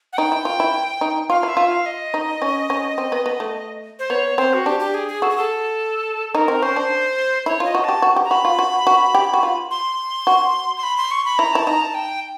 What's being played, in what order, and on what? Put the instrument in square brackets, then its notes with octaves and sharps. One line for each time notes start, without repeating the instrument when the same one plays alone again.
[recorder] F#5
[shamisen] D#4 [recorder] G5
[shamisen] E4
F4
E4
D#4
[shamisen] F4 [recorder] F5
[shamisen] E4
[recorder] E5
[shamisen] F4
[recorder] F5
D#5
[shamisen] D#4
C#4
C#4
C4
B3
B3
A3
[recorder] C5
[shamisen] B3 [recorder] C#5
[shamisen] C4 [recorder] C5
[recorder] F#4
[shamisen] D4 [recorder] G4
[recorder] G4
G#4
G#4
[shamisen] F#4 [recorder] A4
[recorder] G#4
A4
[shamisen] D#4 [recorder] A#4
[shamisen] C4
[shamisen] C#4 [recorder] C5
[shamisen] D4
[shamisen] E4 [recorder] C#5
[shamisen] F4
[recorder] D#5
[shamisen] F#4
[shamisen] G4 [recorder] A5
[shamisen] F#4
G4
[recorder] A#5
[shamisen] F#4 [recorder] B5
[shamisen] F4
F#4
F#4
G4
F#4
F4
[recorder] C6
[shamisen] F#4
[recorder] C6
B5
C6
C#6
B5
[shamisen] E4 [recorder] A#5
[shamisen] E4 [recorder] A5
[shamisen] D#4 [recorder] A#5
[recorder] A5
G5